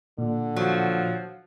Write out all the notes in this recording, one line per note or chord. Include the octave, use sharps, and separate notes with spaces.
A#2 D3
F3 F#3